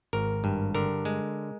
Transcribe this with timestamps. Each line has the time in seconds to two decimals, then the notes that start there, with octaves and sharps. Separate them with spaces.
0.13 G#1 A#4
0.44 G2
0.75 D3 A#4
1.05 G#3